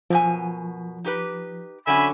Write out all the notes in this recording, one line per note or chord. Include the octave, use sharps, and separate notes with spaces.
F#2 B2 F3 G#5
D#4 G4 B4
D3 F#3 C#4 E5 G#5 B5